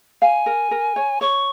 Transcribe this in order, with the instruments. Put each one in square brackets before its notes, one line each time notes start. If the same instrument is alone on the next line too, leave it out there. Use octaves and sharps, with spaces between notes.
[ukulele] F5 [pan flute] G#5
[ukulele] A#4
A#4
C#5
[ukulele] C#5 [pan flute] C#6